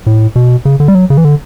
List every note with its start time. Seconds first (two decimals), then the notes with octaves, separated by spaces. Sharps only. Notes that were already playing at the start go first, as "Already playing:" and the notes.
0.06 A2
0.36 B2
0.65 C#3
0.80 D3
0.88 G3
0.95 F#3
1.10 C#3
1.17 E3
1.25 D3